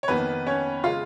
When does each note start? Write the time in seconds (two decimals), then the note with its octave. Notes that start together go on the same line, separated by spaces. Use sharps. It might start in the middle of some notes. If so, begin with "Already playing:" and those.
0.03 C#5
0.08 F2 D#3 A#3 B3 B4
0.46 C#4 C#5
0.84 C#3 G#3 F4 F5